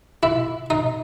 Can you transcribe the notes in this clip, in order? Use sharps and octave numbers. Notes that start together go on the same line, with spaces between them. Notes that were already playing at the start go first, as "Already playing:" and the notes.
E4
D#4